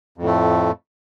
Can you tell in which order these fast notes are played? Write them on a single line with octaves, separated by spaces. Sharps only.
F2 A2 A3